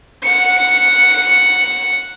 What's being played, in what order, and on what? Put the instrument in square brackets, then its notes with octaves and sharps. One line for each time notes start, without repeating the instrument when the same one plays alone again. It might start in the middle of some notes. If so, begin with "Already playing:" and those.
[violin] F#5 C#7